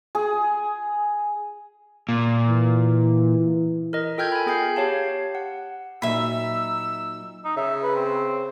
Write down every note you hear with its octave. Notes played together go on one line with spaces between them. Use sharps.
G#4
A#2
E3
A#4 D#5
F4 A4 G5 F6 G6 G#6
G#5 B5
B3 G#4 G5 G6 C7
G4 C#5 F5 A5
F#5
A#2 F#3 D#4 E5 B5 E6
D#4
C#3 E5
B4
C4